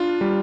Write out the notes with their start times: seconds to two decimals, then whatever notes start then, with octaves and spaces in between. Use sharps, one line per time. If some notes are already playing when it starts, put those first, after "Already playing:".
Already playing: D4 F4
0.21 G3